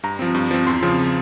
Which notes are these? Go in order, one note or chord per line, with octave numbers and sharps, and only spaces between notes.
G2 A#5
F3 C4
G2
F3 C4
E2 C6
C#3 F3 C4